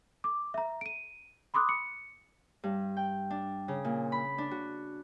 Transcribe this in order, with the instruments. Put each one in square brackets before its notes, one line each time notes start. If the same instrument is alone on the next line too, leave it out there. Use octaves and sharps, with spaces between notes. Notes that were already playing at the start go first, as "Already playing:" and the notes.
[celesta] D6
E5 A#5
D7 D#7
B5 C6 D6 D#6 F#6
C#7
[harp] G2
G5
D4
C#3
A#2
B5
D4
F#4